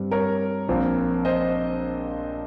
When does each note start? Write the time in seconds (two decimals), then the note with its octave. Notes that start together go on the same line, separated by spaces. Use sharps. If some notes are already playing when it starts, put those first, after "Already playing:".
Already playing: G2 G3 C4
0.11 A#4 C#5
0.69 A#1 A#2 F3 C4
1.25 C5 D#5